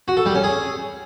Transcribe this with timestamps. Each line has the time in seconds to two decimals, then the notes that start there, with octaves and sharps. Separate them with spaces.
0.08 F#4
0.17 A4
0.26 G3
0.35 C#4
0.44 G#4